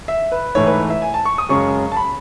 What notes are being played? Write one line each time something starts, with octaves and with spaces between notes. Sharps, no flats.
E5
B4
G#2 E3 A3 E4 C#5
B4
E5
G#5
A5
C#6
D#6
F#2 C#3 G#3 C#4 C#6
A5
B5